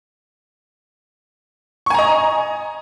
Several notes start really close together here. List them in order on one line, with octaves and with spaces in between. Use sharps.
C#6 G#5 A#5 D#5